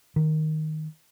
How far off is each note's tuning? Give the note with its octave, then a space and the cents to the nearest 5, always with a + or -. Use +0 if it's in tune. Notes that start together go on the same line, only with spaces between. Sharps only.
D#3 +0